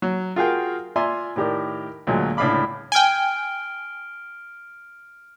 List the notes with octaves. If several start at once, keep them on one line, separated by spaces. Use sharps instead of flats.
F#3
F4 F#4 G#4 A#4 F5 G5
F4 D5 E5 G#5 A#5 C6
A2 D#3 G4 A#4 D5
D2 A#2 F#3 G#3
C#2 A2 D4 F5 B5 D6
G5 G#5 F6 D7 G7